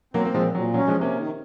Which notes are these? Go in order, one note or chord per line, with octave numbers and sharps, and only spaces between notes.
F#3 A#3 C4
A#3
A#2 F3 G#3
A#2 F#3
F#3 C#4
F3 G#3
C3
A#3 C#4
D#3